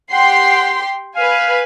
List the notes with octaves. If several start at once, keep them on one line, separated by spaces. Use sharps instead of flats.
G4 F#5 G5 C6
B4 F5 G#5